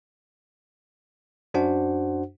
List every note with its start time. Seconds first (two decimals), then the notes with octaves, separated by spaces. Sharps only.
1.54 F#2 D4 F#4 C5 F#5